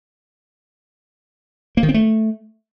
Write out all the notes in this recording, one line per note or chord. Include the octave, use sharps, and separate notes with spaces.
A#3
D#3
C4
A3